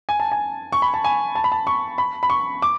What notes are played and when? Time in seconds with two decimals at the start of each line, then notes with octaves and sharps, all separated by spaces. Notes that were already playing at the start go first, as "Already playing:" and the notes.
0.09 G#5
0.20 A5
0.32 G#5
0.73 C#6
0.82 B5
0.94 A5
1.04 G#5
1.35 A5
1.44 B5
1.52 A5
1.67 C#6
1.98 B5
2.23 B5
2.30 C#6
2.62 D6